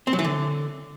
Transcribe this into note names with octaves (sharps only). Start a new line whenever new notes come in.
C4
F#3
E3
D3